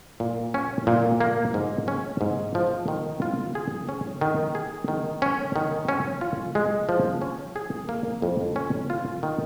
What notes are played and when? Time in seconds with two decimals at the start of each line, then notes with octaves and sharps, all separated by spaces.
0.20 A#2
0.54 C#4
0.87 A#2
1.20 A#3
1.54 G#2
1.88 C#4
2.21 G#2
2.55 F3
2.88 D#3
3.22 F4
3.55 G#4
3.89 C#4
4.21 D#3
4.55 G#4
4.88 D#3
5.22 C#4
5.56 D#3
5.88 C#4
6.21 F4
6.55 G#3
6.89 F3
7.22 C#4
7.56 G#4
7.89 A#3
8.22 F2
8.56 C#4
8.90 F4
9.23 D#3